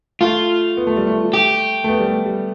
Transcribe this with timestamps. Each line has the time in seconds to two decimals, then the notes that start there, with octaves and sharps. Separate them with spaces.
0.21 A3 F4
0.77 B3
0.87 A3
0.96 G3
1.07 A3
1.33 G4
1.84 A3
1.89 B3
1.99 G3
2.07 A3
2.26 G3